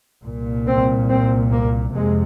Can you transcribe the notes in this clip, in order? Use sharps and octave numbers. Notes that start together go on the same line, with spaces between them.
C2 A#2
C4
C4
A#3
F2 C3 G#3